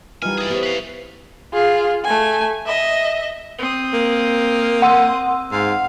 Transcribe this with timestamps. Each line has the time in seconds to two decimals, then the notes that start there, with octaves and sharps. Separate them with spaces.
0.22 E3 G3 D#4 F4 G#5 A#5 F6
0.38 G#4 D5
0.50 B3 G4 C5 C#5
0.63 B4 F5
1.53 F4 G#4
2.04 A3 G#5
2.66 D#5 E5
3.59 C4 D#6
3.93 A#3
4.82 F#5 C6 E6
5.52 G#2 F5